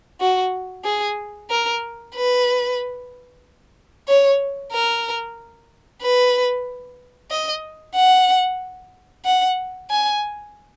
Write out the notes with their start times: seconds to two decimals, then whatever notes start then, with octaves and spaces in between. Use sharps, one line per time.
0.21 F#4
0.84 G#4
1.50 A#4
2.15 B4
4.08 C#5
4.73 A#4
6.02 B4
7.31 D#5
7.96 F#5
9.25 F#5
9.90 G#5